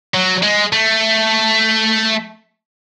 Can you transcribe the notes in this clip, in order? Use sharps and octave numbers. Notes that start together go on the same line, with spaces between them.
F#3
G#3
A3